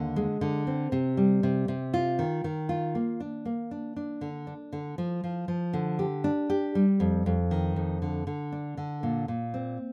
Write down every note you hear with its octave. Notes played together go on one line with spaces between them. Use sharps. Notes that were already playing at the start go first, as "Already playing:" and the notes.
Already playing: D#2 D3
G#3
D3
C4
C3
G3
C3
C3
F4
D#3
D#3
F4
A#3
D4
A#3
D4
D4
D3
D4
D3
F3
F3
F3
D3
G4
D4
G4
G3
F2
F2
D#3
F2
D3
D3
D4
D3
A#2
A#2
C4